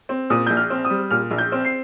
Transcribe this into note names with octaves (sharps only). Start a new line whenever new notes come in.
C4
A#2 D#6
A#1 G6
F6
C4
D#6
G3
A#2 F6
A#1
G6
C4
C7